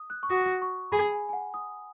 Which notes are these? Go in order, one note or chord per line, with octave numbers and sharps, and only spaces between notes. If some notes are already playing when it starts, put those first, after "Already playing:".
Already playing: D#6
F#6
C#6
F#4 D#6
C#6
G#4 B5
G#5
G#5
F#5
D#6